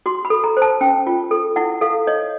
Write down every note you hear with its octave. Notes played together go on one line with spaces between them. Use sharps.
F#4 C6
B5
A4
A#5
C5
A5
C#4 G5
F4
A4
E4 F#5
A4 F5
C#5 D#5